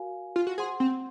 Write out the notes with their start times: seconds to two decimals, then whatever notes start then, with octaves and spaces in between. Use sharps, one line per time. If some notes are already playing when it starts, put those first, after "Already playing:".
Already playing: F#4 A#4 F5 G#5
0.36 F4
0.47 F#4
0.58 G#4 C5 F#5 C6
0.80 C4